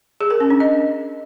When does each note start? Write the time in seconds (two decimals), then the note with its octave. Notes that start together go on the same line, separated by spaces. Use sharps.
0.21 G#4
0.30 A#4
0.40 C#4
0.50 D4
0.60 D#5